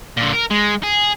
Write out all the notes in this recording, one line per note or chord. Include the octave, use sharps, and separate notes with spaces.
A#2 D3
A#4
G#3
G#4